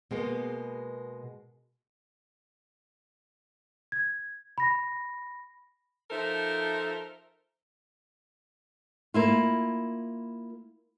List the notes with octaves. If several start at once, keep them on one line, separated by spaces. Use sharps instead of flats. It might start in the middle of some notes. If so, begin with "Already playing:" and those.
B2 G#3 A#3 B3
G#6
B5 A#6
F3 D#4 A4 A#4 C5 E5
A#3 E4 F4